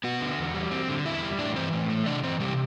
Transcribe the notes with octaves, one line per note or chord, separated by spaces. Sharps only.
B3 F#4
D3
E2
G3
C4
D3
E2 E4 E5
G3
A2 D4 D5
E3 C4 C5
A2
A3
C3 D4 D5
E3 C4 C5
C3 G3 G4